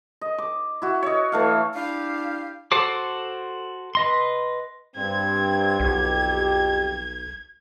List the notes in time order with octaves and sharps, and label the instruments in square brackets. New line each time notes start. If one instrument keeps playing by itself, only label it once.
[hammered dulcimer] D#5
D6
E4 F#4
C#5 D#5
E3 A3 F5
[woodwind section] D4 E4 G4 F5
[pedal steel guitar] F#4 A4 C5 D6
B4 D#5 C6
[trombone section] G2 C4 [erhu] G#6
[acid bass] B1 [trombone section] F2 G4